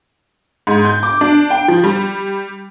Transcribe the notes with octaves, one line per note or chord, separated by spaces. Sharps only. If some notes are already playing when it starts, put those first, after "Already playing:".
G#2
G6
D6
D4
G5
F3
G3